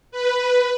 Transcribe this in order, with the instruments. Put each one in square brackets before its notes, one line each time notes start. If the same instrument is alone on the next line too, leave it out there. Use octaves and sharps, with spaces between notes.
[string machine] B4